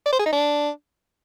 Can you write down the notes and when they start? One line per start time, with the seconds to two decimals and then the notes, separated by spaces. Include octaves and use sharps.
0.06 D5
0.13 C5
0.19 G#4
0.26 D#4
0.33 D4